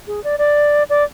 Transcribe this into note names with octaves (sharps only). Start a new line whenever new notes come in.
G#4
D5
D5
D5